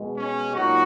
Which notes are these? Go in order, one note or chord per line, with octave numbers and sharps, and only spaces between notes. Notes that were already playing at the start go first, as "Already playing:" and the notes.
Already playing: B2 G#3
C#4
A#2 F#3 D#4 F#4